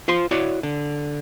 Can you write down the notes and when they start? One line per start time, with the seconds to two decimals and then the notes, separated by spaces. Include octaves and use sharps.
0.08 F4 C5 C6
0.31 E4 F#4 C#5 D5
0.63 D3